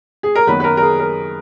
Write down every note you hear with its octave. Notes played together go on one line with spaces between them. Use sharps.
G#4
A#4
F#2 D#3 F#3 B3 B4
B4
A#4
A#4
G#4
A#4